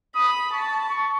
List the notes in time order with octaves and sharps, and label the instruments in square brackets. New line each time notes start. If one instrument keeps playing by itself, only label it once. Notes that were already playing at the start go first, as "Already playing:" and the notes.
[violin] B5 [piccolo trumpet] D#6
[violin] A5 [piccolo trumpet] C#6
[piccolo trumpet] C#6